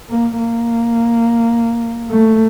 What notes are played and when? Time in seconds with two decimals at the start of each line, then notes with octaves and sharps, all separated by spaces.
0.10 A#3
0.38 A#3
2.11 A3